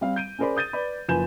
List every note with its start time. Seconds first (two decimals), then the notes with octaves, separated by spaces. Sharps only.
0.01 G3 C4 F5
0.16 G6 D7 D#7
0.39 C#4 G#4 A#4 C5 D5 B5
0.57 D#6 G6 A6 D#7
0.73 B4 D5 B5
1.08 F#1 F3 B4 G#5 G6 E7